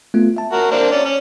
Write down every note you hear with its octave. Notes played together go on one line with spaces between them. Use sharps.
A3 B3 F4
E5 A5
F#4 A#4
A#3 C4 D4
C#4 D5
C#4